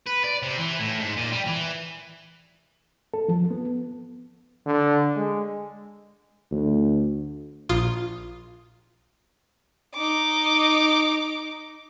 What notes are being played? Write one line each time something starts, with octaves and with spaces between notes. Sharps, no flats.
B4
D5
C3
E3
A2
G#2
A#2
G3
E3
A4
F3
B3
D3
G#3
D2
A#1 F4 D#6
D#4 D6